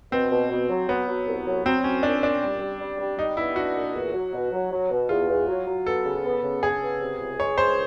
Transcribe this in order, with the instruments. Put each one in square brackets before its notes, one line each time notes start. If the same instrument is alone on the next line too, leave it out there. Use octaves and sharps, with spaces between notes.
[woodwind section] B2 [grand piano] C4
[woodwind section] B2
B2
F#3
[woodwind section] F#3 [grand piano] B3
[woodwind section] F#3
C2
F#3
[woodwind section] F#3 [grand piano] C4
[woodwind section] C2 [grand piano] C#4
[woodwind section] A#2 [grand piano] D4
[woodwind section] A#2 [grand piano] D4
[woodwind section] G3
G3
G3
G3
[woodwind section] G3 [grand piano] D#4
[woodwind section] B3 [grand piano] E4
[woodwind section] D4 [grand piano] F#4
[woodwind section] A#2
E2
F#3
B2
F#3
F#3
B2
[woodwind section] E2 [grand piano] F4
[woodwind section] E2
F#3
F#3
[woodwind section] B3 [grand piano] A4
[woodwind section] C#3
B3
C#3
[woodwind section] C#3 [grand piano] G#4
[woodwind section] B3
C3
C#2
[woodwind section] G#3 [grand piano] C#5
[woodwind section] C#2 [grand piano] C5